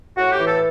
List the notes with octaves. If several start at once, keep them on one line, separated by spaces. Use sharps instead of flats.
A2 F#4
G4
E3
A4